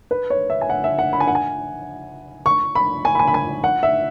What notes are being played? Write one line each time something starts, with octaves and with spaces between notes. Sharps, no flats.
B4
C#5
E5
G#5
F#5
E5
F#5
B5
G#5
F#5
G#5
C#6
B5
G#5
B5
G#5
B5
G#5
F#5
E5